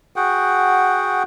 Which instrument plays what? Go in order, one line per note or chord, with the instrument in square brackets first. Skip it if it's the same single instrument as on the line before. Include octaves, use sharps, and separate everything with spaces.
[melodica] F#4 G#4 F#5 G5